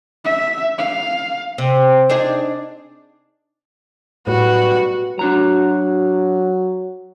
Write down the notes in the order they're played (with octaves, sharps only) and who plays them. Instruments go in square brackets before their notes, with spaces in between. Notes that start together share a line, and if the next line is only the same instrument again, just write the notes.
[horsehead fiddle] E5
F5
[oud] C3
D4 D#4 G#4
[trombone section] B1 G3 B4 [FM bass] A2 [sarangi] F#4
[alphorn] F#3 [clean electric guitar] D4 F#4 A#5